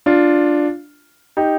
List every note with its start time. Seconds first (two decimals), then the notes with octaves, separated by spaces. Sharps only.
0.06 D4 F4
1.37 D#4 G4